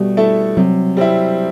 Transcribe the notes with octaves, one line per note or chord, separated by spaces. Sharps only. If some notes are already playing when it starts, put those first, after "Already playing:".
Already playing: B2 G3 A3
A3 E4 A4
C3 F#3
G3 C4 E4